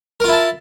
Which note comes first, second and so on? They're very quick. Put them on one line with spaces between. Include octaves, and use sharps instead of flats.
A#4 F4 E4 A5